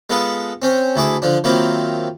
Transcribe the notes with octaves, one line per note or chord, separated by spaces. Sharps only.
G#3 B3 F4 A4 B4
C4 C#4 C5
D2 A3 E4 G#4 D6
D3 F3 D4
D#3 F#3 A#3 C4 E4 F4